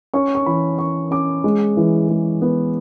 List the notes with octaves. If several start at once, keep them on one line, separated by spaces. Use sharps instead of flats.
C#4 C#6
C#6
E3 B5
C#4 C#6
C#4 D6
G#3
E3
G#3
B3